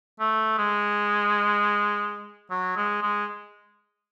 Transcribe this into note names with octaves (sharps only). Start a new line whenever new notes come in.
A3
G#3
F#3
G#3
G#3